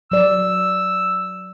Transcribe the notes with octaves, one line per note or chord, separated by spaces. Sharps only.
F#3 D5 E6